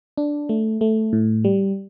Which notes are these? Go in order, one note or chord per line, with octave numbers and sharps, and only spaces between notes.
D4
A3
A3
A2
G3